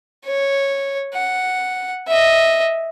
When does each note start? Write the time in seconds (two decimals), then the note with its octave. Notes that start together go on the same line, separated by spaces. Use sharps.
0.26 C#5
1.14 F#5
2.07 D#5 E5